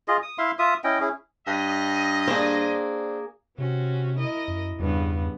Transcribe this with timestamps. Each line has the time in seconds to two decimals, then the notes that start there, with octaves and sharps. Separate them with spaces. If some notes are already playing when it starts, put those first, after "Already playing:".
0.08 F4 G#4 D#5
0.23 D#6
0.38 E4 E5 F5 C6
0.59 F4 E5 D#6
0.84 C#4 E4 D#5 G5
1.01 C#4 E4 G#4
1.47 G2 D#5
2.28 A#3 C4 D4 G#4 C5
3.58 C3 C4 C#4 F#4
4.17 E4 A#4 D#5
4.48 F#2
4.79 E2 G2 C#3 B3